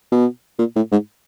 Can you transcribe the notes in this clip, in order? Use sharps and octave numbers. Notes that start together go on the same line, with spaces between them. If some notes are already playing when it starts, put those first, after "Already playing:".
B2
A#2
A2
G#2